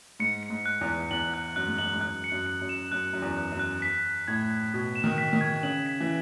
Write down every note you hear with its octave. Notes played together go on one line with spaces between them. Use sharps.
G#2 C#7
C#7
G#2
F#6
E2
F#6
E2 F#7
F#6
F#2 F#6
G#2
F#2 F#7
G#2
F#2 F#6
C#7
F#2
C#7
F#2
E7
F#2 F#6
F#2 F#6
E2
F#6
F#2
F#6
B6
B6
A2 G#6
G#6
B2 G#6
E7
D#3
B6
D#3
G#6
C#3 F#7
B6
E3